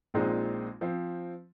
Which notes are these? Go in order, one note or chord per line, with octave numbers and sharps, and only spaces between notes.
A#1 A#2 G#3 C4 D#4
F3 C4